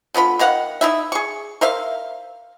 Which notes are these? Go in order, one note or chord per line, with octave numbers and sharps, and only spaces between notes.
D3 B3 F4 B5
D#3 D#4 F5 F#5
D#4 E4 E5
G#4 C#6
A#4 C5 E5 F5